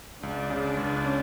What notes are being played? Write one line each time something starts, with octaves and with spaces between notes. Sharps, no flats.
C#2 D4
C#3
C#2
C#4